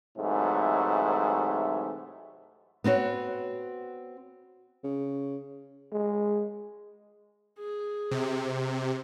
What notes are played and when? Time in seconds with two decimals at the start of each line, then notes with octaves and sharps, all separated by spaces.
0.18 G#2 C3 E3 F#3 A3
2.84 B3 C4 F#4 C#5
4.84 C#3
5.92 G#3
7.58 G#4
8.11 C3